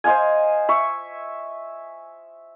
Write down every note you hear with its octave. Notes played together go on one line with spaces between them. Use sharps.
C5 D#5 F5 G#5
E5 C#6